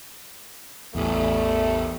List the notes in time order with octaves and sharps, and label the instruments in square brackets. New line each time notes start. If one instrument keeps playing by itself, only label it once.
[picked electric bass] A1 E2 [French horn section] G3 A3